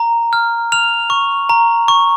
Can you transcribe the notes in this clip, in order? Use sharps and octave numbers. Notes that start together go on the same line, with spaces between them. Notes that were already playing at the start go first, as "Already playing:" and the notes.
Already playing: A#5
F6
F6 F7
C#6
A#5
C#6